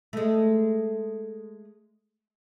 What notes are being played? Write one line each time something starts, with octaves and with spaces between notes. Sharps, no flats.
G#3 A3